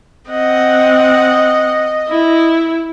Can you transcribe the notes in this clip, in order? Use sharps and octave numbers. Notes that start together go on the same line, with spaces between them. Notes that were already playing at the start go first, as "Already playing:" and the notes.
C4 D#5 F#5
E4